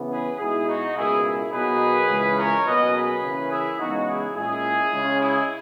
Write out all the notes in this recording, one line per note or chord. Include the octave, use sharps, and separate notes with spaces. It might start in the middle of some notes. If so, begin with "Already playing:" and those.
Already playing: C#3 E3 B3
G#4 B4
B2 G#3 D#4 E4 G#4
D#4 F#4
C#2 B2 A#3 E4 G#4
E4 G#4
B2 F#3 A#3 D#4 G#4 B4
C#2 C#3 E3 G#3 C#4
A#4 C#5
B2 F#3 A#3 C#4 B4 D#5
G#4 B4
C#3 E3 A#3 C#4
E4 G#4
E2 C#3 G#3 D#4 F#4
E4 G#4
A#2 G#3 C#4 E4 G#4
C#3 G#3 C#4
E4 G#4